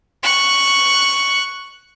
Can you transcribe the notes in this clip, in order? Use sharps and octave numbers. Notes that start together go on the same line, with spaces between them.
C#6 F#6